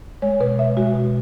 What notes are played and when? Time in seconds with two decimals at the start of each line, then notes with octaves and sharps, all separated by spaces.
0.22 G#3 C#5
0.40 B2 B4
0.59 B2 E5
0.77 G#3 F#4
0.96 B2